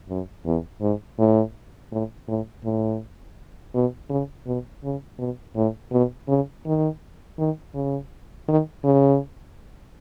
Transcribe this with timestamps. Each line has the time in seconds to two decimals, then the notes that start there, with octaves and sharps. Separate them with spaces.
0.09 F#2
0.46 E2
0.81 G#2
1.19 A2
1.91 A2
2.28 A2
2.65 A2
3.74 B2
4.10 C#3
4.46 B2
4.83 C#3
5.19 B2
5.56 A2
5.92 B2
6.28 C#3
6.66 D#3
7.39 D#3
7.75 C#3
8.48 D#3
8.84 C#3